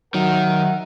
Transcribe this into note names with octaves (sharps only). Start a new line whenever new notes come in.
D#3 F#3 A#4 E5 F#5